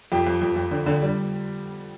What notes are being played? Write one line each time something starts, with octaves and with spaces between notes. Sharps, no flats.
F2 G4 G5
F2
F2
F2
D3
D3
G3